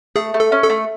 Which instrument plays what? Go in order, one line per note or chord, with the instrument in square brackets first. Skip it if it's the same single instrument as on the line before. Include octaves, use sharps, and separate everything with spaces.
[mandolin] A3 [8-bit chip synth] G#4
[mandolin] A3
[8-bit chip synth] A4
[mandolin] C#4
[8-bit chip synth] A4
[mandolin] A3